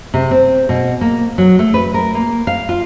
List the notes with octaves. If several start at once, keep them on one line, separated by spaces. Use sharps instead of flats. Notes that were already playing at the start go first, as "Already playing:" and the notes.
C3
C4
B2
A#3
F#3
A3
B4
A#4
A#3
F5
F4